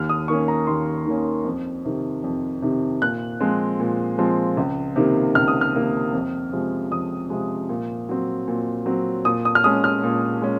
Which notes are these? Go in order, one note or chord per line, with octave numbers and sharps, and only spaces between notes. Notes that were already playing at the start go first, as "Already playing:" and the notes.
Already playing: D#2 F6
D#6
D#3 A#3 C#4 C#6
A#5
D#2 C6
D#3 A#3 C#4
F2
C3 D#3
F2
C3 D#3
A#2 F#6
F3 G#3 C4
A#2
F3 G#3 C4
C#2
C3 D#3 A#3
C#2 F6
D#6
F6
C3 D#3 A#3
F2
C3 F3 G#3
F2 D#6
C3 F3 G#3
A#2
F#3 C4
A#2
F#3 C4
A#2 D#6
D#6
F6
G#3 C#4 D#6
F6
A#2
G#3 C#4